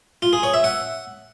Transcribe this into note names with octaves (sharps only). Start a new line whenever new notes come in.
F4
G#4
C#5
E5
F#5